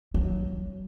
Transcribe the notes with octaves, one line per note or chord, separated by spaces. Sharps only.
F#3